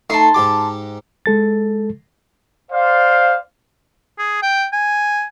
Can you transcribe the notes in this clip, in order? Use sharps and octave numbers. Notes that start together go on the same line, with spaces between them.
A3 D#4 A5 C6
G#2 G4 D6
G#3 A4 A6
C5 D5 F5
G#4
G5
G#5